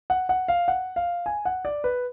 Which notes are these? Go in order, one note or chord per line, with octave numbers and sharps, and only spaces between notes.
F#5
F#5
F5
F#5
F5
G#5
F#5
D5
B4